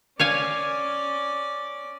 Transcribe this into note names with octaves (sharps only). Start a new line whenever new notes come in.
C#4 C#5 D5 F5 G#5